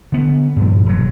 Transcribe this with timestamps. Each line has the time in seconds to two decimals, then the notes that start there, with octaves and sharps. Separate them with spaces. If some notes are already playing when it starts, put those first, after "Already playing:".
0.12 D3 B3
0.56 G2 A#2 F3
0.86 E1 F#3